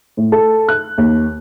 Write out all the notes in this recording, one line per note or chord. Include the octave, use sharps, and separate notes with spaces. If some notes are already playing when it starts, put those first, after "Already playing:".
A2
A4
F#6
D#2